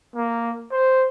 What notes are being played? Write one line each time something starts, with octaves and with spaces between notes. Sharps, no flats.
A#3
C5